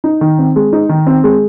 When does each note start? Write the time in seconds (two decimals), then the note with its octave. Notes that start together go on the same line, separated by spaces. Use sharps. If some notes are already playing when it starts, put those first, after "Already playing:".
0.04 D#4
0.21 D#3
0.39 C4
0.56 G#3
0.73 D#4
0.89 D#3
1.07 C4
1.24 G#3